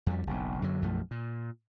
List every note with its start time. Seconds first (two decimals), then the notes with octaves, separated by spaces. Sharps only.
0.06 F2 G3
0.27 F#1 B1
0.62 F#2 D3 F#3
0.82 B1 F#2 F3 A3
1.11 A#2